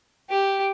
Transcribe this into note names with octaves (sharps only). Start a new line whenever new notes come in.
G4